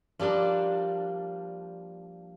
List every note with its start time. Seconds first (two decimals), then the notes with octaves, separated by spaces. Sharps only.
0.19 F3 G3 A#3 D4